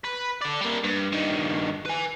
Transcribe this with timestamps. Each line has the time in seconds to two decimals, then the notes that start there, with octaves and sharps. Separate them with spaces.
0.04 B4
0.42 A4 D5
0.61 G3 A#3
0.84 G2
1.13 G2 D#3
1.86 B4 G#5